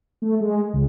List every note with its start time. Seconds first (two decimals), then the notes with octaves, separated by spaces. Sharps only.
0.22 A3
0.40 G#3
0.73 C#2